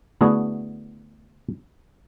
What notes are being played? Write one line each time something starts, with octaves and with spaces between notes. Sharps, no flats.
D3 A3 B3 E4 F#4 G#4